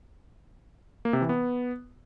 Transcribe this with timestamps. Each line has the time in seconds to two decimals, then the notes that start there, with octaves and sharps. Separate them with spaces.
1.05 A#3
1.13 C3
1.21 E3
1.29 B3